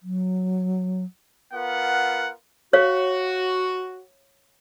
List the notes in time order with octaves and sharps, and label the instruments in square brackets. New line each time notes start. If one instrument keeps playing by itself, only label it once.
[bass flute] F#3
[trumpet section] B3 F4 A#4 [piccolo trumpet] F#5
[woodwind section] F#4 [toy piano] C#5 F5